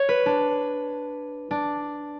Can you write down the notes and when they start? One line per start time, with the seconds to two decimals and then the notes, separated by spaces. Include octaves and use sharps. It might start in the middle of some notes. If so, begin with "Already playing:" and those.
Already playing: C#5
0.09 B4
0.26 D4
1.51 D4